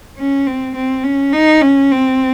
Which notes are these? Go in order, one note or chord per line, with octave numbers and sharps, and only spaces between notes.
C#4
C4
C4
C#4
D#4
C#4
C4